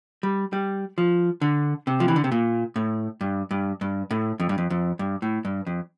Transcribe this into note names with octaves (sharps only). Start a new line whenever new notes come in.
G3
G3
F3
D3
C3
F3
E3
D3
C3
A#2
A2
G2
G2
G2
A2
F2
G2
F2
F2
G2
A2
G2
F2